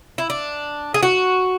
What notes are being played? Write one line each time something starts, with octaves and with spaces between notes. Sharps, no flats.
E4
D4
G#4
F#4